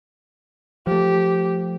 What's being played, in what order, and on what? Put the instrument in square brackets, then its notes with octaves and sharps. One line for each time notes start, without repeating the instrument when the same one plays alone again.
[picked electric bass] F3 A3 [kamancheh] G4